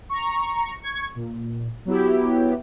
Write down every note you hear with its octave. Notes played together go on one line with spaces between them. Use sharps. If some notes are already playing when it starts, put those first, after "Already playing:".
A#5 C#6
C#6 G#6
A#2
F#3 B3 E4 G4